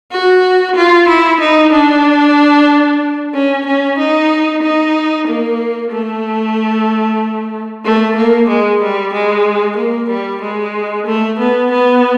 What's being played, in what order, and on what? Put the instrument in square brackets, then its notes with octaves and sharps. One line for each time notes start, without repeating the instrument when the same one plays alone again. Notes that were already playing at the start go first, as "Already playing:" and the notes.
[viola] F#4
F4
E4
D#4
D4
C#4
C#4
D#4
D#4
A#3
A3
A3
A#3
G#3
G3
G#3
A#3
G3
G#3
A3
B3
B3